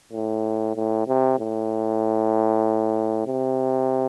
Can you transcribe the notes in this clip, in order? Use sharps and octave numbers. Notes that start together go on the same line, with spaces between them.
A2
A2
C3
A2
C3